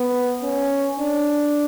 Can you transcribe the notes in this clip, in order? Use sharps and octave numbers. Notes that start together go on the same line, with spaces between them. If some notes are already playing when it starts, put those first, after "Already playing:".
Already playing: B3
C#4
D4